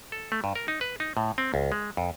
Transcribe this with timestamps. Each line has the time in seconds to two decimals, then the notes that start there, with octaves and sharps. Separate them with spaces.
0.12 A4
0.32 A3
0.44 G2
0.55 A#4
0.68 D#4
0.81 B4
1.00 D#4
1.17 A2
1.38 C4
1.54 C#2
1.72 G#3
1.97 F2